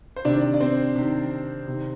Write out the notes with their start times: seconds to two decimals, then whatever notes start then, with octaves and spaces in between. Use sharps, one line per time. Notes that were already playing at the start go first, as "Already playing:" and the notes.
0.16 C5
0.25 C3 D#3 D4 D5
0.54 D5
0.60 C4 C5
0.96 C3 D#3
1.67 C3 D#3